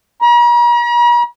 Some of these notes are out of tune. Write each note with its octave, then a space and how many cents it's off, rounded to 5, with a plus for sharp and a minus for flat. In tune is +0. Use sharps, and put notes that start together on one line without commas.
A#5 +45